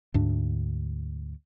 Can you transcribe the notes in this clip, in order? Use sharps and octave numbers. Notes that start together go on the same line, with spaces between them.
D2 G#2 D4